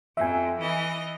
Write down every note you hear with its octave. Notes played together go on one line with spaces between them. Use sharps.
F2 E5 G#5
E3 D#5